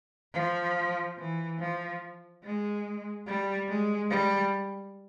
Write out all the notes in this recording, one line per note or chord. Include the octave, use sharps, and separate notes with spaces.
F3
E3
F3
G#3
G3
G#3
G3